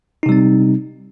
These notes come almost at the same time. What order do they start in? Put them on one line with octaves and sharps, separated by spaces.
D#4 C3 G3 C4